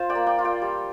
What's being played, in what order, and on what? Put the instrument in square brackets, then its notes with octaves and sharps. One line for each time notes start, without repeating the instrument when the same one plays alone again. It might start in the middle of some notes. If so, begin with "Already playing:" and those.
Already playing: [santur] F4 C5 F5
D5 G5
A#3
D5 G5
F4
D5 G5
G3